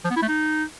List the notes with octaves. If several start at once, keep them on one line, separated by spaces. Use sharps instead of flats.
F3
B3
E4
A3
D#4